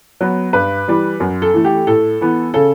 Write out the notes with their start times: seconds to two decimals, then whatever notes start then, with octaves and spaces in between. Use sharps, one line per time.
0.21 F#3 B3
0.53 G2 B4
0.88 E3 G3
1.20 F#2
1.42 A4
1.54 E3 A3
1.65 G4
1.87 A2 A4
2.21 E3 B3
2.54 C#3 A4